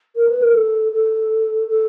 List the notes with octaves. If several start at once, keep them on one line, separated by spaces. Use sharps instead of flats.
A#4
B4
A#4
A4
A4
A4